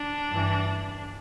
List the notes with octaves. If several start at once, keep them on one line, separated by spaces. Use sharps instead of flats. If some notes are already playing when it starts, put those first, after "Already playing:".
Already playing: D4
G2 E3